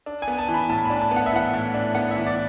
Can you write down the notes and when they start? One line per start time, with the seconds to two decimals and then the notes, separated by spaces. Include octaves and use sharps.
0.06 D4
0.22 G#5
0.28 B3
0.38 A5
0.49 E3
0.54 B5
0.69 A2 A5
0.86 D4 B5
1.01 A5
1.11 B3
1.16 F#5
1.26 E5
1.33 E3 F#5
1.53 A2
1.74 D4
1.95 B3 F#5
2.11 E5
2.16 E3
2.26 D5